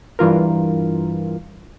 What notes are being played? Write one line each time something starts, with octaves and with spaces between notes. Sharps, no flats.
G2 E3 F4 A#4